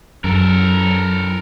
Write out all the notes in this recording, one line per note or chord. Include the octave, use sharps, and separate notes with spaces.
F#2 A4 A#4